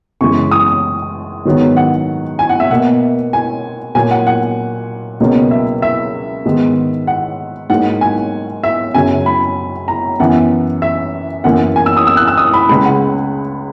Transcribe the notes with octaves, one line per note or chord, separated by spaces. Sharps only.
F#2 C#3 E3 G#3 C#6
D#6
G#2 D#3 F#3 B3
F#5
G#5
F#5
E5
B2 A#3 F#5
G#5
A#2 F#3 A#3 G#5
F#5
F#5
C#2 B2 F#3 A#3
E5
E5
G#2 D#3 G#3 B3
F#5
G#2 F#3 A#3 F#5
G#5
E5
F#2 C#3 F#3 G#5
B5
A#5
F#2 E3 B3 F#5
E5
F#2 E3 A#3 F#5
G#5
E6
D#6
E6
F#6
E6
D#6
B5
C#2 C#3 G#3 B5
F#5